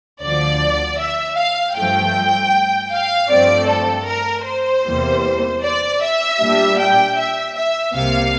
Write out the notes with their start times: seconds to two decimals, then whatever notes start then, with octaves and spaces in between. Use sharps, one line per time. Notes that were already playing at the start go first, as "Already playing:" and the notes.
0.21 D2 D3 F3 D5
0.98 E5
1.37 F5
1.75 G2 F3 A3 G5
2.92 F5
3.30 G2 F3 A3 C4 D5
3.69 A4
4.08 A#4
4.46 C5
4.85 E2 C3 E3 G3 A#3
5.62 D5
6.01 E5
6.39 A#2 G3 D4
6.78 G5
7.17 E5
7.55 E5
7.94 C2 C3 G3 A#3 F5